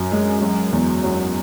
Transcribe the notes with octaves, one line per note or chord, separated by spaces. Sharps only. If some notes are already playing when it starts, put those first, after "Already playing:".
Already playing: F#2
G#3
F#3
E2
F#3